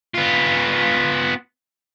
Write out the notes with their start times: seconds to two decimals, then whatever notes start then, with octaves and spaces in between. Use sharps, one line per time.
0.14 B3 F4